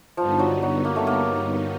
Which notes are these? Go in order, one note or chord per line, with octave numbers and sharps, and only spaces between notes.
G2 D3 F3 G3 B3 D#4
F#3
F#3
A#3
A3
A#3